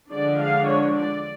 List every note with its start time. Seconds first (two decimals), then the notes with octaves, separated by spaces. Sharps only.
0.11 D3 F3 G#3 D4 D5
0.39 F5
0.68 C#5
0.97 D5